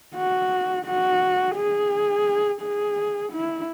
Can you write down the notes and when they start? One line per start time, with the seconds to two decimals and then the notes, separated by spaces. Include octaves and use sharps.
0.15 F#4
0.85 F#4
1.56 G#4
2.61 G#4
3.32 E4